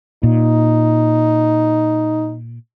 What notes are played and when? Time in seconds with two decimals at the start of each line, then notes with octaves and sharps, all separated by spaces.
0.23 A#2 D#4